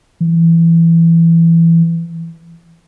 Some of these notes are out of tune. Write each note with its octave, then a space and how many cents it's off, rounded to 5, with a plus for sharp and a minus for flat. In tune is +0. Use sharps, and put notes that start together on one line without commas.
E3 +15